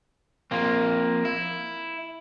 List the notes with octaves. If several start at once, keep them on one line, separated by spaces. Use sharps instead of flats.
F3 A#3 C4
E4